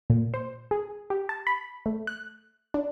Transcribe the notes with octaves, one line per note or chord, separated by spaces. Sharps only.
A#2
C5
G#4
G4
A5
B5
A3
F#6
D4